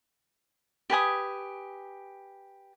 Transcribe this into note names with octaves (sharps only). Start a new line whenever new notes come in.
G4 B4 G#5 D#6